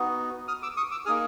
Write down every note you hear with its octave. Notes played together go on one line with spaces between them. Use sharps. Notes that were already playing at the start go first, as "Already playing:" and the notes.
Already playing: B3 D#4 F#4
D#6 F6
D6 E6
C#6 D#6
D6 E6
A#3 D#4 G#4 D#6 F6